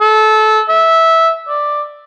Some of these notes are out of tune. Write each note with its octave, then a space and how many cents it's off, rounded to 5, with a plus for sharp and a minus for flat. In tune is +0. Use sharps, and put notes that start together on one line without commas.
A4 -25
E5 -10
D5 +5